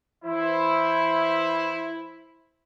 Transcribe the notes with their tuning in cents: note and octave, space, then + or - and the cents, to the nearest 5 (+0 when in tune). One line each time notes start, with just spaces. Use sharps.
E3 +0 E4 +0 C5 +10